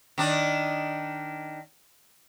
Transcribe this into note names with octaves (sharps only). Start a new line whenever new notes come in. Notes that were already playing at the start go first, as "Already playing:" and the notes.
D#3 D4